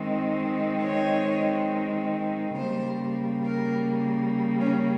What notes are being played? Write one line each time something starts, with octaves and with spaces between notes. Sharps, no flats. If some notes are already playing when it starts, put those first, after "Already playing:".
Already playing: D#3 G#3 C4
C#5
C#3 G3 A#3 C5
A#4
C#4